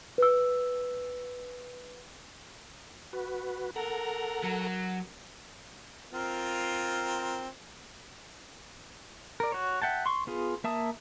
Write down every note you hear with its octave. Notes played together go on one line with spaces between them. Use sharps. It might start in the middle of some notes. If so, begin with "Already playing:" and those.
B4 E6
F#4 B4
A4 A#4 F#5 A#5
F#3
C4 F4 A#4
A#4 D5
F#4 C#5
E5 F#5 G5 A5
C6 C#6
B3 F4 G#4
A#3 E5 A5 D#6